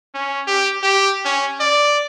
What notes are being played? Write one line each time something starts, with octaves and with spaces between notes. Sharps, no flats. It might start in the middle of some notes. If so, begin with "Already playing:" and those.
C#4
G4
G4
C#4
D5